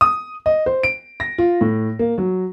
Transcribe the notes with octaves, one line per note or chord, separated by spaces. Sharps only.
D#6
D#5
C5
D7
A#6
F4
A2
A#3
F#3